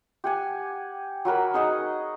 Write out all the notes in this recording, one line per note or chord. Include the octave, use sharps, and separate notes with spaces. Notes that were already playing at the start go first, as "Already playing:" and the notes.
G4 F#5 G#5
F#3 F#4 A#4 B5
D#4 G#4 D#5 F#5